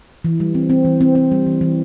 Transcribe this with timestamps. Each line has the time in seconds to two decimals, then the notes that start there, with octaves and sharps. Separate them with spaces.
0.24 E3
0.40 G3
0.55 C4
0.70 C4
0.85 E3
1.01 C4
1.15 C4
1.31 G3
1.47 E3
1.61 E3